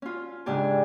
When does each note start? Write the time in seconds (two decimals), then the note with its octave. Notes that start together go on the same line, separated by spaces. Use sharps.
0.02 C#4 F4
0.46 G#2 C#3 D4 G4 G#5